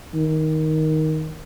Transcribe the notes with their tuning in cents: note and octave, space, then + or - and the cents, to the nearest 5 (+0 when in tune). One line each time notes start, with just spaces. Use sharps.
D#3 +10